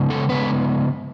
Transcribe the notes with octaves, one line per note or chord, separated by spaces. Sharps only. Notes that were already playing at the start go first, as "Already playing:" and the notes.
Already playing: C#3 G#3 B3
A4
C#3 G#3 B3 B4